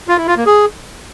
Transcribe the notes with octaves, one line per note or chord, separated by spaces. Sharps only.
F4
E4
F4
A#3
G#4